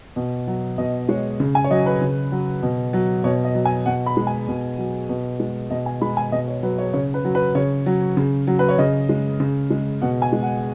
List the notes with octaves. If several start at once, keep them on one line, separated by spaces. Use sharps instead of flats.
B2
F#3
B2 D#5
G#3 C#5
C#3
G#5
C#5
F#3 D#5
B4
C#3
F#3
B2
F#3
B2 C#5
D#5
F#3
G#5
B2 F#5
B5
G#3
G#5
B2
F#3
B2
G#3
B2 D#5
G#5
G#3 B5
G#5
B2 D#5
C#5
F#3 B4
C#5
C#3 C#5
B4
F#3
B4
C#3 C#5
F#3
C#3
F#3
B4
C#5
C#3 D#5
G#3
C#3
G#3
B2 F#5
G#5
G#3
F#5